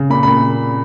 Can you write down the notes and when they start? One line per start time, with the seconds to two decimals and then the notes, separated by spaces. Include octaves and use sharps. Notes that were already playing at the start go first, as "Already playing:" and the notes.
Already playing: C#3
0.10 A#2 B5
0.23 A#2 B5